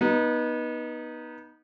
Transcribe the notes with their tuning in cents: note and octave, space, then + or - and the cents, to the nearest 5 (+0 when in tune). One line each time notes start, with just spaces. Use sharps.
B3 -25 D#4 +0